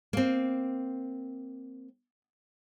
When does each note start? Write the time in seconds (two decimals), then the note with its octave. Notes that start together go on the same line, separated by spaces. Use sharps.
0.13 A#3 C4